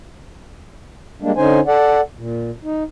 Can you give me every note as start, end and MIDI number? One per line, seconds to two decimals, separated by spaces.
1.22 1.32 55
1.22 1.32 56
1.22 1.32 58
1.22 1.32 62
1.37 1.60 50
1.37 1.60 61
1.37 1.60 63
1.37 1.60 72
1.37 1.60 80
1.67 2.01 69
1.67 2.01 74
1.67 2.01 78
2.17 2.51 46
2.64 2.83 63